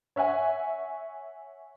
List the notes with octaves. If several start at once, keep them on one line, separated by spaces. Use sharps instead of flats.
C#5 E5 F#5 G#5